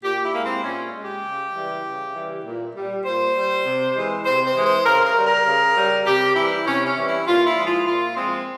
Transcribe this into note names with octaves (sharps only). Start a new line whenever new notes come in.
A#2 G4
E4
G#3 A#3
C4
A#2 C#4
G#3
G4
C#3
E3 G3
C#3
E3 G3
A#2
G3
A#2 C5
G3
C3
E3 G#3
C3 C5
C5
E3 G#3
C5
C#3 A#4
A#4
G3
A#4
C#3
G3
C3 G4
E3 G3 E4
C3 C#4
C#4
E3 G3
E4
A#2 F4
E4
F3 G#3
F4
A#2 F4
F3 G#3 C4